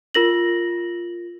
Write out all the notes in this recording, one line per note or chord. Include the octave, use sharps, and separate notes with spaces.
F4 A#4 A#6 F#7